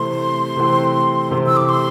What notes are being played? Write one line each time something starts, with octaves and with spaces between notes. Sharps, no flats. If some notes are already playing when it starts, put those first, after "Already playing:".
Already playing: C3 E3 A3 C4 C6
C3 E3 A3 C4
C3 E3 A3 C4
E6
D6
C6